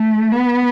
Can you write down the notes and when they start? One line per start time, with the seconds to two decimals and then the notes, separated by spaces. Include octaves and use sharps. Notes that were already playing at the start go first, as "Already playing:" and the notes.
Already playing: A3
0.32 B3